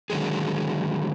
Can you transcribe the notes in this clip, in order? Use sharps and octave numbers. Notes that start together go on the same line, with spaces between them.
D3 D#3 F#3 G#3 G#4